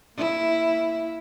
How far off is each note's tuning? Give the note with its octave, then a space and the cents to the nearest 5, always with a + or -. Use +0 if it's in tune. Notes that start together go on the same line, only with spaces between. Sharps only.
A#3 +0 E4 +0